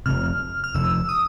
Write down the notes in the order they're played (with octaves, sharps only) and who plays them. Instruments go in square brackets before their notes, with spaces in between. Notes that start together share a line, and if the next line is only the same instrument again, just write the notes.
[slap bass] F1 F2 C3 [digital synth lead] F6
[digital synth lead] F6
[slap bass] F1 F2 C3 [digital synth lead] E6
[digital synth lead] D#6